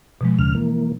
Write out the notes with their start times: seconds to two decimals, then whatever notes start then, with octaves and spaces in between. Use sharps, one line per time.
0.21 B2 F3 G#3
0.39 D#2 C#3 F6
0.55 E3 A#3